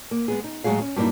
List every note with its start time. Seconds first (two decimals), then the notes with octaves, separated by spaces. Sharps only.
0.11 A#3
0.28 G#3 B3 G#4
0.44 D#4
0.64 A2 F#3 G#3 F#4 G#4 F5
0.81 C#4
0.96 G2 F#3 A#3 C4 D#4 E4